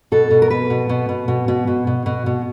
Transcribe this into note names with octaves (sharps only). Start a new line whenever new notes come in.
B2 A4
B2
A#4
B2 B4
B2
B2
B2
B2
B2
B2
B2
B2
B2